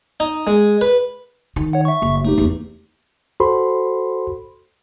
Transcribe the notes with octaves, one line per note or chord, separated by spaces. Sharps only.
D#4
G#3
B4
D#3
C#5 F#5
E5 C#6
F#1
A3 D#4 G4
E2 A#3
F#4 A4 C5 B5 C6